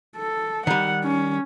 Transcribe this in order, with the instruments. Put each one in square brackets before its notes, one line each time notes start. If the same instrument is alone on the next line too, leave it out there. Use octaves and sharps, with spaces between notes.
[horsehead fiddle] A4
[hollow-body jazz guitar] D#3 G3 [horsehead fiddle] F#5
[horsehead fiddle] C#4